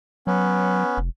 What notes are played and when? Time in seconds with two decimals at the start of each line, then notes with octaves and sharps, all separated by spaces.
0.27 F#3 B3 C#4
0.97 F1